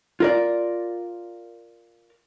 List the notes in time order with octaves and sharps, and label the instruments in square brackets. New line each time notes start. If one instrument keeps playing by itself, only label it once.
[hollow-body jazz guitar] F4 A#4 D5